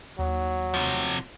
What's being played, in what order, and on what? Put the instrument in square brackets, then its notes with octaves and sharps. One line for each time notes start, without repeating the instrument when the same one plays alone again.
[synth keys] D#2 [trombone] F#3
[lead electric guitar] C3 F3